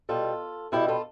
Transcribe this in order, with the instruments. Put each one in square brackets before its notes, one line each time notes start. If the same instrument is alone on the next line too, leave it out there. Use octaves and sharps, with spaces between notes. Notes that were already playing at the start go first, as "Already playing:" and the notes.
[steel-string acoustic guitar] B2 G3 F4 A4
B2 G3 E4 G4
F4 A4